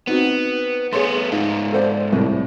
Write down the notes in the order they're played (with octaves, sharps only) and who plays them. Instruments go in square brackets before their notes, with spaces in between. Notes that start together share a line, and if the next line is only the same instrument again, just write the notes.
[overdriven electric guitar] B3 [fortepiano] C4 D#4 F#4
[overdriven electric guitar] A3 B3 [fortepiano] G#4 C#5 C6
[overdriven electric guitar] G#2 F4 [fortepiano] D#4
[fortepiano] A4 C5 D5
C2 A2